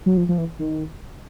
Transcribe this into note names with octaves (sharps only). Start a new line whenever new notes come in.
F#3
F3
F3
E3
D#3